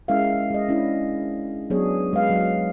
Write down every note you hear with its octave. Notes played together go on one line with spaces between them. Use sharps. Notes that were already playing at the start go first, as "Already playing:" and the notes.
G#3 C#4 E4 A#4 E5 F5
G#3 D#5
C#4 D4 E4 D#5
F#3 B3 D4 G#4 C#5
G#3 B4 F5
F#3